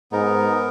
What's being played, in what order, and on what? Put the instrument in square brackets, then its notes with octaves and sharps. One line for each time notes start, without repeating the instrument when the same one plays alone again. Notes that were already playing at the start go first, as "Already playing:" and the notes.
[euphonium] G#2 [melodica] B3 D#4 A#4